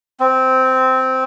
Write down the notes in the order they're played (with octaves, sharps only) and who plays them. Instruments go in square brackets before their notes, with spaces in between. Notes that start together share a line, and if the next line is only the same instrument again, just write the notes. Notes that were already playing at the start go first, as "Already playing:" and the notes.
[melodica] C4